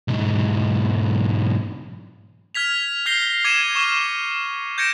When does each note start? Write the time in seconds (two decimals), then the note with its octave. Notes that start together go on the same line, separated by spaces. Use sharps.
0.08 B1 G#2
2.55 F6 G#6 B6 F7
3.06 F6 G6 A#6 C7 G7
3.44 D6 G#6 C#7 D#7 E7
3.75 C#6 D6 F6 D#7
4.78 G6 G#6 A#6 C#7 D7 E7